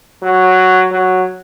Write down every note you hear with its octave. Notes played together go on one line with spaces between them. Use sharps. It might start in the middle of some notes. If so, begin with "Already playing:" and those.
F#3
F#3